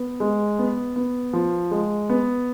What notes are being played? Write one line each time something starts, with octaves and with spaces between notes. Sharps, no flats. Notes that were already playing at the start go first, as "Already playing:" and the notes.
Already playing: B3
G#3
B3
B3
F3
G#3
B3